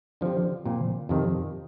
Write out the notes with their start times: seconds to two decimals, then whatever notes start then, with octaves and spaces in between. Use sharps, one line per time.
0.21 D3 F3 C4 G4
0.65 A#2 F3 C4 F4
1.09 F2 C3 D#3